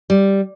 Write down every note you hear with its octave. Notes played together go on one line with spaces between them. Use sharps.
G3